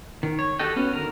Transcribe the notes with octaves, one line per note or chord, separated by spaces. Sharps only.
D#3
C#5
F#4 G4 A4 D#5 G5
B3 C#4 F#4
D3 D#3 A#4 A#5